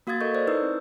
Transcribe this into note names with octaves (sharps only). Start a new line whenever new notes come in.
A#3 F#4 F5 D#6 G#6 A6
A4 A#4 D#5 C#6 G6
C5 D5
D#4 E4 B4 D#6 E6 G6
C4